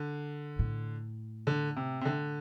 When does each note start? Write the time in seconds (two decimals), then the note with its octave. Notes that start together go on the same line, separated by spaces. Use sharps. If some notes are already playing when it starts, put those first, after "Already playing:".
Already playing: D3
0.59 A2
1.47 D3
1.76 C3
2.01 C3
2.05 D3